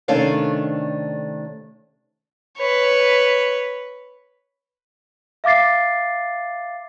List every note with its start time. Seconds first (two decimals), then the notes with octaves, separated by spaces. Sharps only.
0.08 C3 D#3 A3 C#4 D4 F5
2.58 B4 C#5
5.44 E5 F5 D6 A6 C7